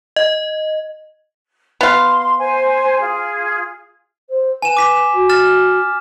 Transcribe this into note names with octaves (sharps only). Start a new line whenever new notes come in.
D#5
B3 F5 C6
C5 G#5
F4 G#4
C5
B4 G#5 E7
D6 B6 E7
F#4
F6 A6 E7